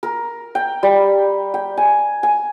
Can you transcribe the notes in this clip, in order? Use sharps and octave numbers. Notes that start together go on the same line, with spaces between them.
A#4
G5
G3
G5
G#5
G#5